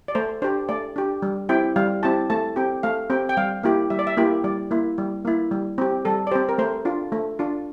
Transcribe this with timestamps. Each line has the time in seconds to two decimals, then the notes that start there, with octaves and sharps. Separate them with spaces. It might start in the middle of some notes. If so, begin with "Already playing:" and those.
0.08 D5
0.15 A3 C5
0.42 D4 G4 C5
0.69 A3 D5
0.96 D4 G4
1.22 G3
1.49 C4 E4 G4 G5
1.76 G3 F5
2.03 C4 E4 G4 A5
2.30 A3 A5
2.56 C4 G4 G5
2.83 A3 F5
3.10 C4 G4 G5
3.29 G5
3.37 G3 F5
3.63 A#3 E4 G4
3.90 G3 E5
3.99 D5
4.07 E5
4.17 A#3 E4 G4
4.44 G3 D5
4.71 A#3 E4
4.98 G3
5.25 A#3 E4
5.51 G3
5.78 C4 G4
6.05 G3 A4
6.27 D5
6.32 C4 G4 C5
6.49 A#4
6.58 A3 C5
6.85 D4 F4
7.12 A3
7.39 D4 F4